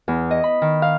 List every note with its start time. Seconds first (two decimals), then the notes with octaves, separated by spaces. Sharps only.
0.08 E2
0.31 D#5
0.44 B5
0.62 D#3
0.82 F5